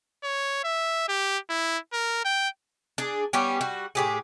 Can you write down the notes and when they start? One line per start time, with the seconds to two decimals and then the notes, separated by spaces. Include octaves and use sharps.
0.23 C#5
0.64 E5
1.09 G4
1.50 E4
1.93 A#4
2.25 G5
2.98 D4 G#4
3.33 G3 B3 C#4 G4
3.61 G3 F#4
3.95 A2 G4 G#4